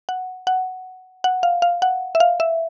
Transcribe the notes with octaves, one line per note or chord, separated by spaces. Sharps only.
F#5
F#5
F#5
F5
F5
F#5
E5
F5
E5